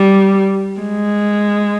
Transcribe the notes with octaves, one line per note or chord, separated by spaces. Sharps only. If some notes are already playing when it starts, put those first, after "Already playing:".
Already playing: G3
G#3